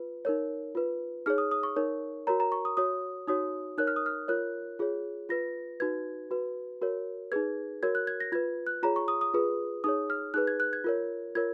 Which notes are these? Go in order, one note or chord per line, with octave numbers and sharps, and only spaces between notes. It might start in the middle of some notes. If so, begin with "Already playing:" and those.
Already playing: F4 B4
D#4 A#4 C#5
F4 B4
D#4 G#4 C#5 F6
D#6
D#6
C#6
D#4 A#4 C#5
F#4 A#4 C#5 A#5
A#5
C#6
D#6
F#4 C#5 D#6
D#4 F#4 C#5 D#6
D#4 A#4 C#5 F#6
F6
D#6
F6
F4 A#4 C#5 F#6
F4 G#4 C#5
F4 B4 A#6
D#4 F#4 B4 G#6
F#4 B4
F#4 A#4 C#5
D#4 G#4 B4 G#6
F#4 A#4 C#5 G#6
F#6
G#6
A#6
F4 B4 G#6
F#6
F4 G#4 C#5 A#5
C#6
D#6
D#6
F4 G#4 B4
D#4 G#4 C#5 D#6
F6
D#4 G#4 B4 F#6
G#6
F#6
G#6
F4 A#4 C#5
F4 A#4 C#5 G#6